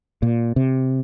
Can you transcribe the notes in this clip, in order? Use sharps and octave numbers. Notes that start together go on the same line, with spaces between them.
A#2
C3